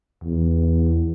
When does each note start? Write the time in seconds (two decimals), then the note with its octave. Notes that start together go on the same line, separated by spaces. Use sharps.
0.24 E2